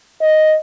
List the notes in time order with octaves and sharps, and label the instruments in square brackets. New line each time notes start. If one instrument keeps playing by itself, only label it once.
[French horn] D#5